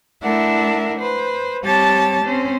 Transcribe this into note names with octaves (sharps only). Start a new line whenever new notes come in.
A3 D4 E4 A#4 E5 F#5
B4 C5
G3 C4 G4 C#5 A5 A6
C4 C#4 C5